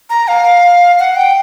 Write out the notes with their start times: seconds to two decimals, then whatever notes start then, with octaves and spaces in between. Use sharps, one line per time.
0.10 A#5
0.28 F5
0.99 F#5
1.16 G5